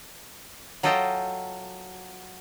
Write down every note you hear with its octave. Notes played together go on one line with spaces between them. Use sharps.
F#3 F4 A4 D#5 G5 A5